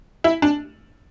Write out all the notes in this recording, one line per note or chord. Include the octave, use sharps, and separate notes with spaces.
E4
D4